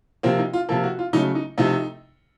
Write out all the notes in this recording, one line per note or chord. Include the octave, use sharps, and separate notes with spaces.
C3 F3 A#3 C4
D#4
F4
C3 F3 A#3 A4
F#4
F4
C#3 F#3 A3 D#4
D#4
C3 F3 A3 D#4